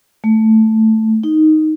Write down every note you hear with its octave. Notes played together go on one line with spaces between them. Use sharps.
A3
D#4